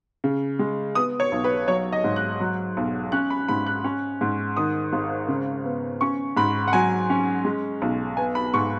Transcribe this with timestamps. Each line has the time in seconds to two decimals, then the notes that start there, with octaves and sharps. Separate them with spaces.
0.24 C#3
0.59 G#3
0.95 B3 D#6
1.20 C#5
1.32 B1
1.44 B4
1.68 F#3 C#5
1.92 D#5
2.04 G#2
2.16 F#6
2.40 F#3
2.77 B1
3.12 C#4 F#6
3.30 B5
3.48 G#2 B5
3.67 F#6
3.84 C#4
4.21 G#2
4.57 D#3 D#6
4.93 G#1
5.28 C#3
5.65 B3
6.01 C#4 C#6
6.37 G#2 B5
6.68 F#5
6.73 F#3 G#5
7.10 C#4
7.45 G#3
7.82 B1
8.17 B3 G#5
8.35 B5
8.54 G#2 C#6